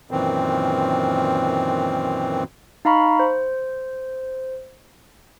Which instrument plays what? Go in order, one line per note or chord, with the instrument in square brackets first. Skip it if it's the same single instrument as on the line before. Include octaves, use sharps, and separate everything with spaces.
[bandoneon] F#2 A#2 D#3 E3 C4
[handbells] D#4 F5 A#5 B5 C#6
C5